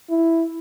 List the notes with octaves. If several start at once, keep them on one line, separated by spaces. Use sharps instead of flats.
E4